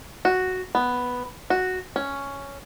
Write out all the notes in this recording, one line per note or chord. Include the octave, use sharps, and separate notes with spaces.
F#4
B3
F#4
C#4